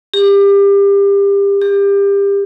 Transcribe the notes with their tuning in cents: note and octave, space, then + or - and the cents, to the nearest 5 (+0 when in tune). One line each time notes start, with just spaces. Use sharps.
G4 +30
G4 +30